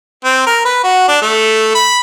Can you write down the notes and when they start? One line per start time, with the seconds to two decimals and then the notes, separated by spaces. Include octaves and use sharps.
0.24 C4
0.47 A#4
0.65 B4
0.84 F#4
1.08 D4
1.22 A3
1.75 B5